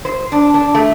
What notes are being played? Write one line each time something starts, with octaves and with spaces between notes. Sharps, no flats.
C5
D4
D4
A3